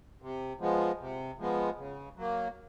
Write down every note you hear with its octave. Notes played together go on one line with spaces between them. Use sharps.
C3
F3 G#3 B3
C3
F3 G#3 B3
C#3
F#3 A#3